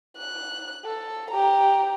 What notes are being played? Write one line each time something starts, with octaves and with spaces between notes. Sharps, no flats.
F#6
A4
G4 A#5